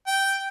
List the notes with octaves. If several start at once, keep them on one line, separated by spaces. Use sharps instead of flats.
G5